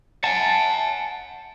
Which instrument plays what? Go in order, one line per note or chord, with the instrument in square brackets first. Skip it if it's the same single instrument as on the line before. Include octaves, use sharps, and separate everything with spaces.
[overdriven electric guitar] F#5 G#5 [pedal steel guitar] A5